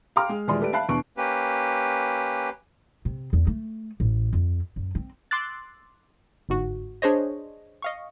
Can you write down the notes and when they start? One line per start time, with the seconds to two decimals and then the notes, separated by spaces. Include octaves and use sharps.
0.16 F5 G5 A#5 C6 D6 F6
0.29 G#3
0.48 D#1 E3 G#3 G#4 D5 C6
0.60 A3 G4 A4 B4 D5 D7
0.73 E5 F5 A5 B5 F#6 C7
0.89 E2 B2 D4 C#6 D7
1.17 A#3 C#4 G4 B4
3.05 C3
3.33 E2
3.47 A3
4.00 A1
4.33 F2
4.76 F#2
4.95 C4
5.31 C6 D6 E6 F#6 A6
6.49 G1 G#2 F#4
7.02 D4 G#4 C5 C#5 D#5
7.82 D#5 F5 C#6